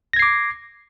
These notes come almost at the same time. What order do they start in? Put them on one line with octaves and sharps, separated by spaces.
A#6 G#6 C7 D6